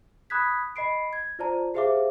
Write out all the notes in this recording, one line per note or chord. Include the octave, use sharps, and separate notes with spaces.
B5 D#6 F#6 G#6 B6
D#5 B5 C7 D7
G#6
F4 C5 D5 A5 A#5
G4 G#4 C5 E5 F5 D6